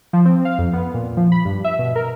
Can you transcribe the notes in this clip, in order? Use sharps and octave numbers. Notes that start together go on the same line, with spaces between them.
F3
C4
F5
F2
B3
A#2
F3
B5
G2
E5
B2
A#4